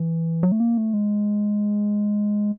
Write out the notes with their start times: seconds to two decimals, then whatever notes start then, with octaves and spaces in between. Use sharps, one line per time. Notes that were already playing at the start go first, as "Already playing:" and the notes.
Already playing: E3
0.43 F#3
0.52 A3
0.60 A#3
0.78 A3
0.93 G#3